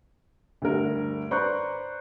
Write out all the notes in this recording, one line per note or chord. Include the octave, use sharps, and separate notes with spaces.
D2 G2 A#4
B4 C5 D5 A#5 C#6 F#6